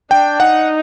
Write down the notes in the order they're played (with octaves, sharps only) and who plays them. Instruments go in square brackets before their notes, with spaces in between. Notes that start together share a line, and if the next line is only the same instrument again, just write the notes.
[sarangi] D4 [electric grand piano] G5
[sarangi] D#4 [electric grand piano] F#5